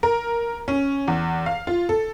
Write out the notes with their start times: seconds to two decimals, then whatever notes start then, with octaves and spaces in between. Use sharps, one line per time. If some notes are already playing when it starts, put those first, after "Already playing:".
0.03 A#4
0.68 C#4
1.08 E2
1.46 F5
1.67 F4
1.89 A4